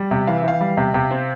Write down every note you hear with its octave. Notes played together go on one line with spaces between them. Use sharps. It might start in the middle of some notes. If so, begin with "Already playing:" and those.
Already playing: G3
C3
E3 F5
E5
E3 F5
G3
C3
C3
C4